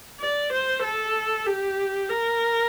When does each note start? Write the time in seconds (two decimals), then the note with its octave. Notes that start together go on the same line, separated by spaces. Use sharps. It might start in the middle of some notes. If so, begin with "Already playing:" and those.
0.21 D5
0.53 C5
0.83 A4
1.47 G4
2.10 A#4